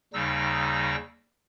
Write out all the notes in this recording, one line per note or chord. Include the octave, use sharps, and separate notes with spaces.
D#2 C#3 G3 D#4 E6 A#6